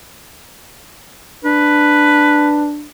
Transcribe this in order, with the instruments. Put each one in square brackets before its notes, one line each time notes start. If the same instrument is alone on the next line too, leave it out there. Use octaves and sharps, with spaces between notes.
[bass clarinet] D4 [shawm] B4